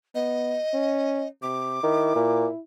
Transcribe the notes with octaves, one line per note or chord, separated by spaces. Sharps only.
B3 D#5
C#4
C3 D6
D#3 E4
A#2